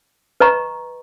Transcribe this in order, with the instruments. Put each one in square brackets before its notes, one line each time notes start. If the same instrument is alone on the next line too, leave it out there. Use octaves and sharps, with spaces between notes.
[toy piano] B4 D#5 A#5 C#6